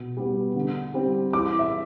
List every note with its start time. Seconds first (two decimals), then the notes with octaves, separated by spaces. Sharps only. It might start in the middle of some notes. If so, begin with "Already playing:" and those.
Already playing: B2
0.17 G3 B3
0.56 D3
0.94 G3 C4
1.33 E3 D6
1.59 E5